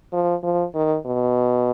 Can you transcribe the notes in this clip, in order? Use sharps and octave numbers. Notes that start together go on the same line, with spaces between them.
F3
F3
D#3
B2